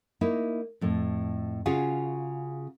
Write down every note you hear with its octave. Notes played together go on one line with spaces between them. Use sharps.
A#3 D#4 E4
F2 A2
C#3 C#4 F4 F#4 G#4